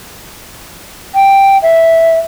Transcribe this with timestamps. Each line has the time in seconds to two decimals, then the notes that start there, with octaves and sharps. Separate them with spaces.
1.15 G5
1.62 E5